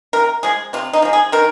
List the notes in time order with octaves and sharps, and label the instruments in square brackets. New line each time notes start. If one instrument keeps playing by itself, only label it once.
[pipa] C3 A#4
F3 G#3 G#4
C3 F4
D#4
F3 G#3
G#4
D#3 A#4